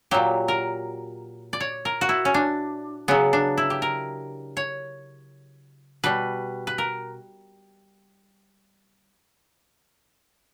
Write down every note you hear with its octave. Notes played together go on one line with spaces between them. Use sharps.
A#2 F#3 G4
A#4
D5
C#5
A#4
F#4
E4
C#4
D4
C#3 F#3 B3
D4
E4
G4
A#4
C#5
B2 G3 B4
B4
A#4